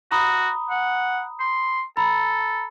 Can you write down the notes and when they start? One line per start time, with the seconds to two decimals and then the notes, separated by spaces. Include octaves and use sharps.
0.11 F#4 A#5 B5 D#6
0.70 F#5
1.40 C6
1.97 A4 A#5 B5